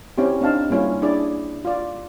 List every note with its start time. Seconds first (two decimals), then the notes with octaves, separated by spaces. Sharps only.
0.18 C4 C#4 E4 G4
0.41 C4 D4 D#4 F5 A5
0.70 G3 A#3 C#4 E4 F4
1.02 D4 E4 G#4 D5
1.65 F4 D5